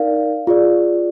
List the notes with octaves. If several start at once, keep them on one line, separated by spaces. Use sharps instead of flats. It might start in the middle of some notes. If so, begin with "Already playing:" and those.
Already playing: D#4 A#4 D5 F5
F4 G#4 D5